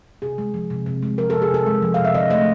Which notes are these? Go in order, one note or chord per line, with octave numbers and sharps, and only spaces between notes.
C3 G#4
G#3
F3
C3
C3
G#3
F3 A#4
C3 A4
G#4
C3 A4
G#3
F3
C3 F5
E5
D3 D#5
A3 D#5